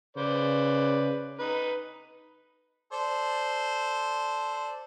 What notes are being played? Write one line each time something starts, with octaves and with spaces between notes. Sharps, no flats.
C#3 B4 C5 D5
D#4 B4
A4 C5 D5